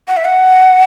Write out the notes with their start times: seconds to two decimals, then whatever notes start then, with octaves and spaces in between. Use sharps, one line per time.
0.08 F#5
0.17 E5
0.25 F#5